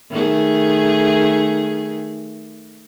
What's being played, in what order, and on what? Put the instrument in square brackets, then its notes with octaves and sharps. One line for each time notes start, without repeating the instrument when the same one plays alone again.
[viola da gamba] D#3 A3 G#4